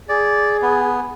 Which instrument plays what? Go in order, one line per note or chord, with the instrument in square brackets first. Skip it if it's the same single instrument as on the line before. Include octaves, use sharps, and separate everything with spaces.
[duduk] G#4 [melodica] D5
[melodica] B3